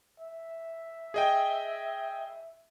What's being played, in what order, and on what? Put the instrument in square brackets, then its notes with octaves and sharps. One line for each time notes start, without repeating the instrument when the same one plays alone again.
[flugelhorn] E5
[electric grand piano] G#4 D#5 G5